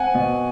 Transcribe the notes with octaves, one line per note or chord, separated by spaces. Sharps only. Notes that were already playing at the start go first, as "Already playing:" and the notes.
Already playing: C4 F#5 G#5
B2